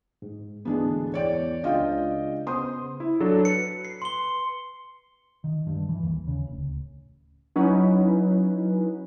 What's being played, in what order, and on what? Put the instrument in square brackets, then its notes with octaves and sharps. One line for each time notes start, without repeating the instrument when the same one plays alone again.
[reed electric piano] G#2
[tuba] D2 [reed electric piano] G#2 E3 G#3 [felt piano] B3 D4 G#4
[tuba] E2 [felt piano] C#5 D5 G5
[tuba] C#2 [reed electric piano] D4 F4 [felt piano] D#5 G5
[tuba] C#3 [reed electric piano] B3 C5 [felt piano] C6 D#6
[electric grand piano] E4
F#3 D4 A4
[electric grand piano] B4 [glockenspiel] C#7
[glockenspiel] C7
C6 G7
[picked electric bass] D#3
G2
E3
D#2
C#3
D1
[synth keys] F#3 C#4 D#4 E4 B4